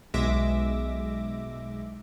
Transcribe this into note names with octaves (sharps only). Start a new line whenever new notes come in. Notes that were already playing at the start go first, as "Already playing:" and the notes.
B1 G#3 E5 D6 A#6